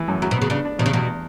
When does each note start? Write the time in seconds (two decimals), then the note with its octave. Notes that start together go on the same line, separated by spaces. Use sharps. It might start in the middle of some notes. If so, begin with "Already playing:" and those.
Already playing: E3
0.08 F#2
0.22 E2 F#3
0.31 B2
0.37 C#3 B3
0.50 C#3 D4
0.65 D4
0.79 E2 B2
0.86 C#3
0.93 E2 B2